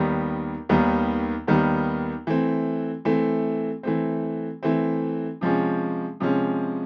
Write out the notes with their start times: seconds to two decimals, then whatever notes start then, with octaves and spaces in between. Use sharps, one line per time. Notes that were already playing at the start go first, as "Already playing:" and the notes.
Already playing: D#2 D#3 G3 B3
0.69 D#2 D#3 G3 B3
1.47 D#2 D#3 G3 B3
2.27 E3 A3 C4
3.05 E3 A3 C4
3.83 E3 A3 C4
4.63 E3 A3 C4
5.41 C3 F3 G#3 C#4
6.20 C3 F3 G#3 C#4